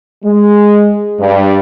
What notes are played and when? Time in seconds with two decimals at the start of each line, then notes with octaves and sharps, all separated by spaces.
0.22 G#3
1.18 G2